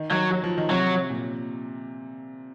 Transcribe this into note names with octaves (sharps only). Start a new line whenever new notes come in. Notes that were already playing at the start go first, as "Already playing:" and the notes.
Already playing: D#3
D#3 F#3
F#3
F3
D#3
C3 F#3
A#2